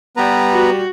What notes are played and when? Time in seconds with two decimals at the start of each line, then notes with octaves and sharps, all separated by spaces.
0.17 G3 B3 B4 A#5
0.52 F#4